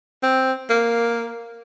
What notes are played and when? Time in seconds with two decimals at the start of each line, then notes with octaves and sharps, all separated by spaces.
0.23 C4
0.70 A#3